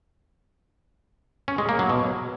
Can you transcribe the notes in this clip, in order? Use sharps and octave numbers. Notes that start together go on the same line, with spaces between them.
C#4
G#3
A#3
F#3
B2